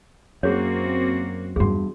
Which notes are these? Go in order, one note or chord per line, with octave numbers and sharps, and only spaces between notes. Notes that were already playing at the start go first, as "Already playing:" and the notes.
F#2 A#3 C4 F#4 G#4 C#5
E2 G2 F#4 G#4